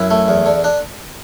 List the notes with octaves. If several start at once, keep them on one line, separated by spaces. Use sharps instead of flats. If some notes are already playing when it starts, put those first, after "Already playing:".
Already playing: F#2 E4
A3
E2
D3
D4